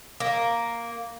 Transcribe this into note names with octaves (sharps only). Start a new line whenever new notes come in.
A#3